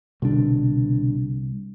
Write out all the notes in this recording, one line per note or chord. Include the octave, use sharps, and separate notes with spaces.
C2 B2 D3 D4